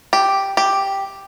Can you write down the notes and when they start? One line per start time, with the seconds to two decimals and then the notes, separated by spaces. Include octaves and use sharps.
0.13 G4
0.57 G4